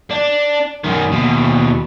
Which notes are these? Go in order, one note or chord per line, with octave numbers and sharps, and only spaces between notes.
D4
F#2 D#3
D#2 B2